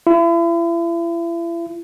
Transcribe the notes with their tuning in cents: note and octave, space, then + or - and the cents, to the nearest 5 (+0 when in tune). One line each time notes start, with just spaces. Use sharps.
E4 +40